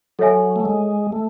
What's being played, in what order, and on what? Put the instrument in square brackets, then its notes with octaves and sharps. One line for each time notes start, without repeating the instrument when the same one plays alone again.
[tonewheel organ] F#3 [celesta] A4 C#5 E5 G#5
[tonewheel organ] A3
G#3
A3